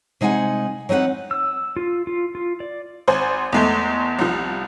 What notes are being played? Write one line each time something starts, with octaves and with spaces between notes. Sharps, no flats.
C3 G#3 D#4 F#5 G#5
F#3 C4 D#4 B4 F#5
E6
F4
F4
F4
D5
G#1 C5 G#5
E2 G#3 A3
C2 F3